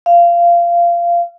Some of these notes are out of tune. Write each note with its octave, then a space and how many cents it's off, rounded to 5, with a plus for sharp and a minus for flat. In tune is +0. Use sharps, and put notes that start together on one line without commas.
F5 -20